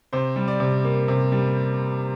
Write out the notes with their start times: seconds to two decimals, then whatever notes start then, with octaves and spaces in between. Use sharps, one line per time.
0.13 C3 C5
0.36 G3
0.48 D5
0.60 C3
0.84 A#3
1.08 C3
1.32 G3